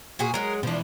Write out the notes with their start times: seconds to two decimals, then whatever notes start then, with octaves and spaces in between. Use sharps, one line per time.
0.19 A#2 F#4 G#4
0.34 F#3 G#3 A#4
0.63 B2 E3 F3 D4